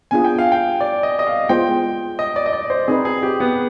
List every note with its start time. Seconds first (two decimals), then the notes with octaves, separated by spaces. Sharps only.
0.11 B3 D4 F4 G#4 G#5
0.24 G5
0.39 F5
0.52 G5
0.81 D5
1.03 D#5
1.19 D#5
1.27 F5
1.49 G#3 B3 F4 C5 G5
2.19 D#5
2.36 D5
2.46 D#5
2.53 D5
2.70 C5
2.88 C4 D#4 G#4 B4
3.05 G#4
3.23 G4
3.40 B3